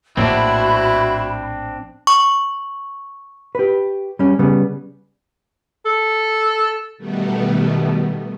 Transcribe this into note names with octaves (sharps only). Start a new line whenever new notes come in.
A#1 A2 A#3 C4 D4 E4 F#4 B5
C#6
G4 B4
G3 C#4
C#3 G3 B3
A4
B2 D#3 G3 A3 B3